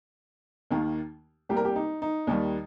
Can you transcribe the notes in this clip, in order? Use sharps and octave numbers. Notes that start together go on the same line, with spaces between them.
D#2 D#3 A#3
C2 C3 G3 A#3 G4
A#4
G4
D#4
D#4
D#2 D#3 G3